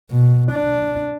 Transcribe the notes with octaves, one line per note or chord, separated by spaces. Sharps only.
B2
D4